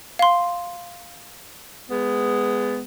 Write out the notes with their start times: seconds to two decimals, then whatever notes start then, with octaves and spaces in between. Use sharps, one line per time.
0.19 F5 C6
1.90 G#3 B3